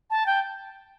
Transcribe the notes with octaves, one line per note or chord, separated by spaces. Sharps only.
A5
G5